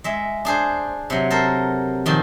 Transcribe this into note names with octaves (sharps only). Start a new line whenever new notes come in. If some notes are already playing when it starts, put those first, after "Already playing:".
G#3 E5
D4 G#4 C5
C3 F#3
A4 A#4 C5
A#2 D#3 F3